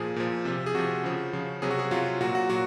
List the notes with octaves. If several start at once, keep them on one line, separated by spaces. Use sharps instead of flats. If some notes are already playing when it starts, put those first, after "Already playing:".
Already playing: A#2 F3 G#4
A#2 F3
C3 F3
G#4
C3 F3 F#4
C#3 F3
C#3 F3
C3 F#3 G#4
F#4
G#4
C3 F#3 F4
A#2 F#3 F#4
F#4
A#2 F#3 F#4